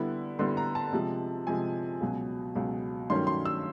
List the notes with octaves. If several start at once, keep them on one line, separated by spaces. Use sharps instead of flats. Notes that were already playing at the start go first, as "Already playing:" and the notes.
Already playing: D3 G3 B3 E4
D3 G3 B3 E4 C6
A#5
A5
C3 F3 G#3
C3 F3 G#3 G#5
C#2 B2 F#3
C#2 B2 F#3
G2 D#3 F#3 A3 C#4 C6
C6
E6